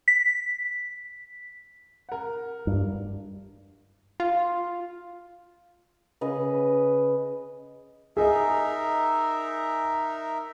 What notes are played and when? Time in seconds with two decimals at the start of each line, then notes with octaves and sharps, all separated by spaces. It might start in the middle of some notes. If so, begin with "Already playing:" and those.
0.08 B6
2.09 A#4 F#5
2.67 G2
4.20 F4
6.21 C#3 B4 D#5
8.17 D#4 G#4 A#4 D#5 E5